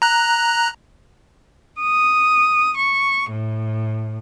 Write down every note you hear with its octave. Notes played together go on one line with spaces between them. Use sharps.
A#5 F#6
D#6
C#6
A2